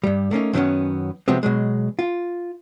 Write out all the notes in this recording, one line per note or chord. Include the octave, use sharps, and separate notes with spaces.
G2 G3
A3 A#3 C#4 D#4
F#2 D#3 F#3 A3 B3 C#4
C3 F3 F#3 G#3 B3 C4
B2 F#3 G#3
F4